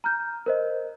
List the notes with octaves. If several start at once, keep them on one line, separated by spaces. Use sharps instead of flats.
A#5 F6 G6
A#4 C5 D#5